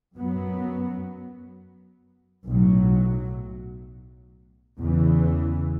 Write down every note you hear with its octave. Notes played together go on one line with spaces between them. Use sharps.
F#2 F#3 B3
B1 A2 F#3
E2 C#3 E3